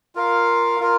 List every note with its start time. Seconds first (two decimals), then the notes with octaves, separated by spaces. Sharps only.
0.15 F4 A#4 F5
0.80 F4 A#4